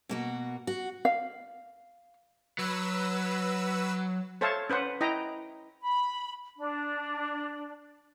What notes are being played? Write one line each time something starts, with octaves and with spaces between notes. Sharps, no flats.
B2 A#3 F#4
F#4
F5
F#3 B4 E6
A4 C5 C#5 E5 F5 A5
C#4 B4 C5 F#5
E4 D#5 G5 A#5
B5
D4